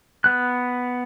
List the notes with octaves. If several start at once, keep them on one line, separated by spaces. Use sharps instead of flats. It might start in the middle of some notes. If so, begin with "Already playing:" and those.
B3 F#6